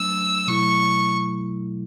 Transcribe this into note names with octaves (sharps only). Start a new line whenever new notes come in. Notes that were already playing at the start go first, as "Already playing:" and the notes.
Already playing: F#3 A3 D4 E6
B2 F#3 A3 E4 C#6